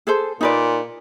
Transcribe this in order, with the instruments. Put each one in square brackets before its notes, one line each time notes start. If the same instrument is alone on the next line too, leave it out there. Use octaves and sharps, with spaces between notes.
[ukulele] G#4 A4 C5
[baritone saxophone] A#2 [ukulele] D#4 B4 D5